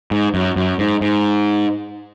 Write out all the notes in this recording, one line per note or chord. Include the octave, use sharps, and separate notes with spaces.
G#2
F#2
F#2
G#2
G#2